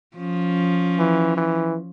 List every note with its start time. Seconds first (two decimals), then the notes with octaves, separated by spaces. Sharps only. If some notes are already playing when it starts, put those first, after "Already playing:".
0.17 F3 C#4
0.99 E3
1.37 E3